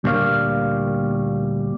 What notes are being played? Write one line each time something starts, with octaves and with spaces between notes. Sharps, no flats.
D2 A#2 G3 A#3 C#5 F5